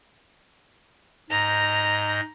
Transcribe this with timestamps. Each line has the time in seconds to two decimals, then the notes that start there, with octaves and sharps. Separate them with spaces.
1.30 G#2 D#5 A#5 G6